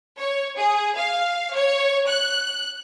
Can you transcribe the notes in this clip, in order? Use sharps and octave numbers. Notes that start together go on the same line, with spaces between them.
C#5
G#4
F5
C#5
F#6